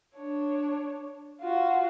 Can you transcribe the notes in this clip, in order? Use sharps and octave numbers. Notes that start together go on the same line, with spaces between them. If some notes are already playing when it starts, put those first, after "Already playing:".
D4 C#5
F4 F#4